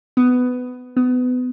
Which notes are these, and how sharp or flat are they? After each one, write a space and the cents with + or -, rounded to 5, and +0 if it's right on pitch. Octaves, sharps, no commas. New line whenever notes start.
B3 +15
B3 +25